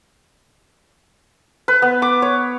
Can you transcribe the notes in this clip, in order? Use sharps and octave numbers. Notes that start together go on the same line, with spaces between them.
B4
B3
D6
C#5